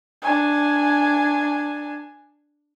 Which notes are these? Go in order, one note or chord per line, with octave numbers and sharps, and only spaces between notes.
D4 G#5